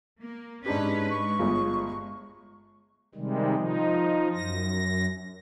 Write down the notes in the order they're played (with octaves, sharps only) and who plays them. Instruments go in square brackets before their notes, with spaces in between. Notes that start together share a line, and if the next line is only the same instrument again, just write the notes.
[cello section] A#3
[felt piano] G#2 D4 G4 [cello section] C#4 B4
[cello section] G#3 [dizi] C#6
[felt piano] G1 F4 G#4
[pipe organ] C3 D#3 G3 G#3
F3 D#4
F#2 A#6